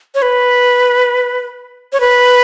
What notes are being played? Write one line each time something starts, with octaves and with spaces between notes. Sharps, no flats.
C#5
B4
C#5
B4